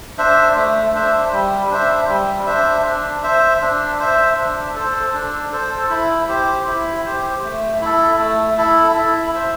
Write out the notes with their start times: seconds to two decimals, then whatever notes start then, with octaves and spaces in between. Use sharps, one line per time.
0.18 D4 C5 E5
0.56 A3
0.94 D4 C5 E5
1.32 G3
1.70 D4 C5 E5
2.09 G3
2.47 D4 C5 E5
2.85 D4
3.23 C5 E5
3.61 D4
3.99 C5 E5
4.38 D4
4.76 A4 C5
5.14 D4
5.52 A4 C5
5.90 E4
6.29 G4 C5
6.67 E4
7.05 G4 C5
7.43 A3
7.81 E4 A4
8.19 A3
8.58 E4 A4
8.96 E4
9.33 C5 E5